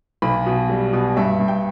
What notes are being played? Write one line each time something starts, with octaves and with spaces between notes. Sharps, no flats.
B1 B5
B2
G3
B2
G2 E5
G2
G5